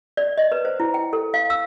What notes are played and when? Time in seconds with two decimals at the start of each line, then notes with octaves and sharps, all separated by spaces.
0.17 D5
0.38 D#5
0.52 B4
0.65 C5
0.80 E4
0.94 G5
1.13 A4
1.34 F5
1.50 E6